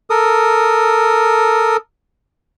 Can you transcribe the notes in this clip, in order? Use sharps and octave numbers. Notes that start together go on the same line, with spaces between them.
A4 A#4 D#6